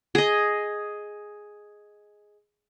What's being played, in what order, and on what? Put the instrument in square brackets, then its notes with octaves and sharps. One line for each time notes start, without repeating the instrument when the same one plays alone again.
[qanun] G#4 D#5